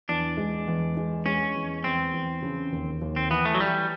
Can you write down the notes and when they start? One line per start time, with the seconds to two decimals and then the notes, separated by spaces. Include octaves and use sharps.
0.09 E2 D4
0.37 G#3
0.68 E2
0.97 G#3
1.25 G#3 C#4
1.56 E2
1.84 E2 C4
2.13 E2
2.42 C#3
2.72 D#2
3.02 D#2
3.16 C4
3.30 E3 B3
3.45 A3
3.54 F#3
3.60 E3 G3